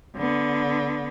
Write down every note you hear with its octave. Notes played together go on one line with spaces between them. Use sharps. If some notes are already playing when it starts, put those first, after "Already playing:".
D3 B3